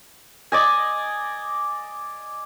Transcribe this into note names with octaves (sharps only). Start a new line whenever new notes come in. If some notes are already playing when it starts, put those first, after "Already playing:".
D5 D#5 G#5